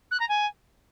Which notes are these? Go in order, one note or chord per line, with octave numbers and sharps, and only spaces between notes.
F#6
A#5
G#5